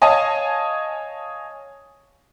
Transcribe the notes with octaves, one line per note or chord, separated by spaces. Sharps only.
C#5 D#5 F5 G#5 A5 D#6